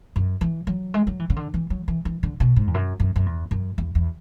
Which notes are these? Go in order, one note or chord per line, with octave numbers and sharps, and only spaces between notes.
F#2
E3
F#3
G#3
F#3
E3
C#3
D3
E3
F#3
E3
E3
D3
B2
G#2
E2
F#2
F#2
F#2
E2
F#2
E2
E2